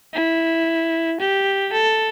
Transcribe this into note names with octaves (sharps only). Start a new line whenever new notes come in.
E4
G4
A4